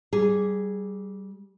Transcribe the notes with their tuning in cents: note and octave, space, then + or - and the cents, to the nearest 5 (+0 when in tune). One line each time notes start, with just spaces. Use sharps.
G3 -20 G#4 +0